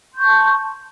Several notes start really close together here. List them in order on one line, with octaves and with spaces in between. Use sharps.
C6 G6 C#6 A5